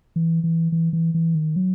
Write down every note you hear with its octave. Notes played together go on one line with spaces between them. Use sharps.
E3
E3
E3
E3
E3
D#3
F#3